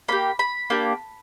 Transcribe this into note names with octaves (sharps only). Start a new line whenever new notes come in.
A#3 D4 G4 B5
B5
A#3 D4 G4